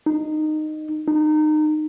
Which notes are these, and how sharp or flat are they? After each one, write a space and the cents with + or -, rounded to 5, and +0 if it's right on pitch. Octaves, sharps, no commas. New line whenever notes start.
D#4 -15
D#4 -25